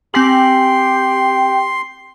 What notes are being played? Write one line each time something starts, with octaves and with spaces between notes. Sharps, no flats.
C4 G4 G#5 C6 F#7